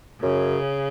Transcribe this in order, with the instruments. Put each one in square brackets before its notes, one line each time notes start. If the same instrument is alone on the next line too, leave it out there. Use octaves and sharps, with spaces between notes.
[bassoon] F#2 [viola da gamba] C#3